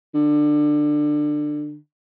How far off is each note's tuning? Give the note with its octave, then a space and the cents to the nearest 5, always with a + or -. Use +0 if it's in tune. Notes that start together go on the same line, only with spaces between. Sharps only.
D3 +20